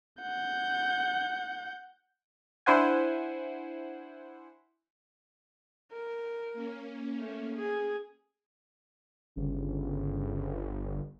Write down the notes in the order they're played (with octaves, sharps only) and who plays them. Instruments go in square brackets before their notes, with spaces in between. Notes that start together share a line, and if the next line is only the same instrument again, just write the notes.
[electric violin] F#5 G6
[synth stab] D4 E4 C5 F#5 G#5
[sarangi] A#4
[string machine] A#3 C#4
[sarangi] A3
G#4
[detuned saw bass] G1 [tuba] C#3